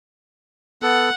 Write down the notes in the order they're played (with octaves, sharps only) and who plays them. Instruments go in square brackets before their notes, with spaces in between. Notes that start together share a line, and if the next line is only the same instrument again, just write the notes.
[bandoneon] B3 A4 [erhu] F#5